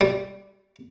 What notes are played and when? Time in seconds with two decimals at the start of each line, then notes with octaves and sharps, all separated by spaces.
0.01 G3